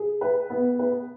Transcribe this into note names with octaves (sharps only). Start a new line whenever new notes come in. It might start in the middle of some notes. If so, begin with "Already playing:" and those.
Already playing: G#4
B4
B3
B4